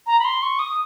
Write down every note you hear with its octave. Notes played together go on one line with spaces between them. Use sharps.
A#5
B5
C6
C#6
D#6